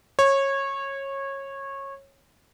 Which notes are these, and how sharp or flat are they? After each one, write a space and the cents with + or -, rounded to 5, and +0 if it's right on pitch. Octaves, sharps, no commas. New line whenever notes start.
C#5 -20